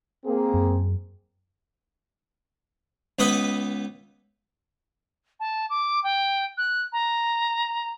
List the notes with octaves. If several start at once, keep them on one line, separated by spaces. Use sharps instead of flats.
A#3 C4 G#4
F#2
C#2 B3 B4 D#5 F#5 B5
A5
D6
G5
F#6
A#5